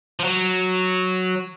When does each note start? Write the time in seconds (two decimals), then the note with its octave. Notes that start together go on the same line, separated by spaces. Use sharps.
0.20 F3
0.24 F#3